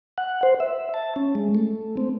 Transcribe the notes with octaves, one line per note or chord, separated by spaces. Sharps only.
F#5
C5
E5
A5
C#4
G#3
A3
C4